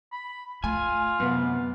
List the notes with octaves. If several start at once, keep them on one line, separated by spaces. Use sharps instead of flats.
B5
A3 F4 G#5
F#2 C3 B3